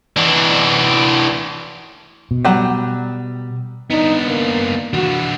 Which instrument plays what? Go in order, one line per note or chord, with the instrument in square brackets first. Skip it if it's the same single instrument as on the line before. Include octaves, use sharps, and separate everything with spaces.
[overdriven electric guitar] E3 D4
[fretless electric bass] B2
[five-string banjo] F#3 G3
[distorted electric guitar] B3 D4 [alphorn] D#4
[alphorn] A#3
[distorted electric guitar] E3 D4 [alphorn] F#4